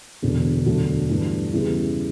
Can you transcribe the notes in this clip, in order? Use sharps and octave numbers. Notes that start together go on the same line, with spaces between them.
E1 E2 D3
E1 D2 D3 F#3 A3
G2 E3 A3 D4
E2 C#3 G3 B3 E4